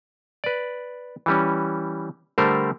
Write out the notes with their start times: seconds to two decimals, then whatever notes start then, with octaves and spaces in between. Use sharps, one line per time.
0.44 B4 D5
1.26 E3 G3 C#4
2.38 D3 G3 A3 A#4 C5